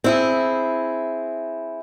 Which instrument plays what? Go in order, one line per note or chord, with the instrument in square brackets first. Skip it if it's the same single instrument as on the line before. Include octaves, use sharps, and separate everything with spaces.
[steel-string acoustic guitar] C4 E4 G#4